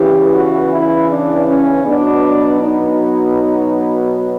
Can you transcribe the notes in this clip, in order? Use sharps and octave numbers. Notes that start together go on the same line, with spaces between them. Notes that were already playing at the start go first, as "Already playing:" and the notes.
Already playing: E2 C#3 E3 G4
F#4
E4
D4
C#4
B2 F#3 B3 D4
D#4